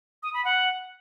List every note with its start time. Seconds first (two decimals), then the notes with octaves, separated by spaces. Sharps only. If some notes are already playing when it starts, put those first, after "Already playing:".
0.23 D#6
0.34 B5
0.45 F#5